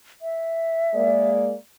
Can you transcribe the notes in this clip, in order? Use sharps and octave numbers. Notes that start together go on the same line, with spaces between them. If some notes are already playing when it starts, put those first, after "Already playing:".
E5
G#3 A#3 D5